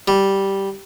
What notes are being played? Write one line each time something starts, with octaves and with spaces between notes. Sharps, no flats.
G3